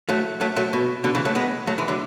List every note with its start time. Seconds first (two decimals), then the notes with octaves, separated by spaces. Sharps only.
0.09 F#3 A3
0.41 F#3 A3
0.56 F#3 A3
0.73 B2
1.04 B2 D3
1.15 C#3 E3
1.25 F#3 A3
1.35 G#3 B3
1.67 F#3 A3
1.78 E3 G#3
1.88 D3 F#3